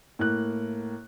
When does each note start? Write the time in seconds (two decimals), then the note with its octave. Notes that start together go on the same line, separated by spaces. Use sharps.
0.19 A2 A#3 F#6